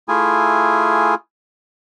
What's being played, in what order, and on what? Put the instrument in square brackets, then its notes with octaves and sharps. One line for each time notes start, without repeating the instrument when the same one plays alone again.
[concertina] A3 E4 F4 G#4 G#5